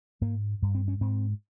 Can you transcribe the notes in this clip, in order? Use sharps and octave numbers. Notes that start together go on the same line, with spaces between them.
G#2 A#3
G2
C4
C#4
G#2 C4